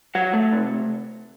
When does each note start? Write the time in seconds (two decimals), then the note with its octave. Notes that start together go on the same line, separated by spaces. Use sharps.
0.15 F#3 F#5
0.34 A3
0.52 C3